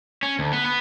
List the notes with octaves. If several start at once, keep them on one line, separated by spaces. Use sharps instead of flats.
C#4
D2
B3
B3